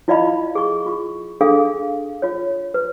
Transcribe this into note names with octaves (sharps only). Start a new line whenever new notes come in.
E4 F4 D5 D#5 F5 B5
G#4 C#6
F4 C#6
D4 G#4 A4 F5 D#6
F4 C#5
B4